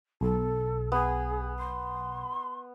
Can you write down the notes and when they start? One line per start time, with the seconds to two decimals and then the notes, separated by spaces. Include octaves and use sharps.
0.21 B1 A4
0.92 B3 G#4
1.58 C6